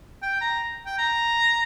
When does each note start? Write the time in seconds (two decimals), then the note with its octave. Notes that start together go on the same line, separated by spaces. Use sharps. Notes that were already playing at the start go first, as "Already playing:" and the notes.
0.22 G5
0.42 A#5
0.86 G5
0.98 A#5